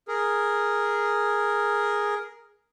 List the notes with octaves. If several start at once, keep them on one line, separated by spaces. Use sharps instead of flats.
G#4 A#4